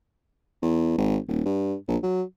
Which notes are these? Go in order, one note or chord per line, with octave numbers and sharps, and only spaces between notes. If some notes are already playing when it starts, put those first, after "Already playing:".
E2
G#1
D#1
G2
A#1
F#3